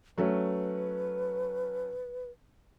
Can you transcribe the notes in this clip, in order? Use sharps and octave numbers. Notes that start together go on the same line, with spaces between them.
F#3 A3 C#4 B4